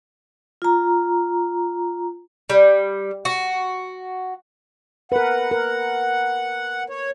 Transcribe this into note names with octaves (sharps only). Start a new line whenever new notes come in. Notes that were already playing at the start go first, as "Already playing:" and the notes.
F4 A#5
G3
F#4
A#4 B4 F#5
A#4
C#5